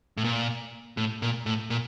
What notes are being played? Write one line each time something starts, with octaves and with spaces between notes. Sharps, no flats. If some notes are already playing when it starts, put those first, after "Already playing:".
A2
A#2
A2
A#2
A2
A#2